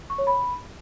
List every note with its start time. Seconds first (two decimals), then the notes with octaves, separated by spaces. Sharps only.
0.10 C#6
0.18 C#5
0.27 B5